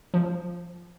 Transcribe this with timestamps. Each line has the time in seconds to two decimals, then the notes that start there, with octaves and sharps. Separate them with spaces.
0.14 F3